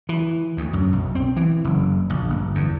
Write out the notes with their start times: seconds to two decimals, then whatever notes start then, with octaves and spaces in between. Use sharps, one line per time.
0.09 E3
0.57 D2
0.73 F#2
0.93 B1
1.15 C4
1.36 E3
1.64 F#1
2.10 A#1
2.30 G1
2.55 E2